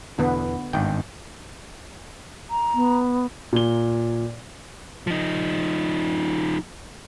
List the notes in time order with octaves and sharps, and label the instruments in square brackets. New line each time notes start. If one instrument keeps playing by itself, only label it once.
[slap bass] E2 B2 E3 [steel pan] D3 B3
[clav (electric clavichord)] G#1 G5 [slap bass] G2 D#3
[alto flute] A#5
[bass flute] B3
[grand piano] A#2 G7
[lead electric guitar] F3 D#4